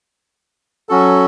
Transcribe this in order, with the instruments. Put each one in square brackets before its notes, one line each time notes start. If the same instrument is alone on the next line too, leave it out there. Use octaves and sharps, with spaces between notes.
[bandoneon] F#3 C#4 F#4 A4